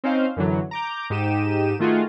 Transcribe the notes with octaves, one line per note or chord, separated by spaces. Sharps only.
C4 C#4 D#4 C5 F5
F#2 D3 E3 F#3
A#5 D6 G6
G#2 D#4 G4 D#7 E7
D#3 A3 F4 F#4 G#4